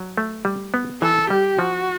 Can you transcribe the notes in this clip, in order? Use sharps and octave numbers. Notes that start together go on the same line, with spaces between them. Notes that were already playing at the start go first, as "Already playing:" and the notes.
Already playing: F#3
A3
G3
B3
E3 A4
G3 G4
F3 F#4